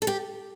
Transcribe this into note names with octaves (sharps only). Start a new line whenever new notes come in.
A4
G4